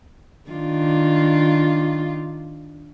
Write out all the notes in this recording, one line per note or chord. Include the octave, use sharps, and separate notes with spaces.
D#3 D4 F4